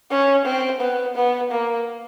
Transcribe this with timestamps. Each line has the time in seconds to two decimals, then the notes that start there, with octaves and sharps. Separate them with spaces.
0.10 C#4
0.45 C4
0.80 B3
1.16 B3
1.51 A#3